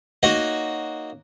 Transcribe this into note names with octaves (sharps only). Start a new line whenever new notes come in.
A#3 D#4 F#4 C#5 D#5